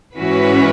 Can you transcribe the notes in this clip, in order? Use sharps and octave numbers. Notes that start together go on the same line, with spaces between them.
G#2 E3 C#4 F#4 B4